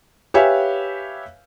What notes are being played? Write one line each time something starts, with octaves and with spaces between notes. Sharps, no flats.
G4 B4 C#5 E5 F5 G#5